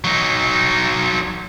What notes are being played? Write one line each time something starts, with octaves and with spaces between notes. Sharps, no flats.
F#3 D#4